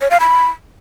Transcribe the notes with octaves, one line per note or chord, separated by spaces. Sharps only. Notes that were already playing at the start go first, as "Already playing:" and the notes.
C#5
F5
B5